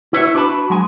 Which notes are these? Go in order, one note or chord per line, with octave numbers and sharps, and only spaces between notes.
E4 B4 C#5 E5
D4 F#4 B4 C5 A5 B5
F#3 G#3 G#5